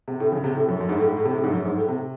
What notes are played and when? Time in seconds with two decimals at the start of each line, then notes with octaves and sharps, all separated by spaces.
0.08 C3
0.20 A2
0.32 C#3
0.44 C3
0.56 A2
0.69 F#2
0.81 F#2
0.89 G#2
0.98 A2
1.08 G#2
1.17 A2
1.25 C3
1.34 A2
1.44 G#2
1.52 F#2
1.65 G#2
1.77 A2
1.88 C3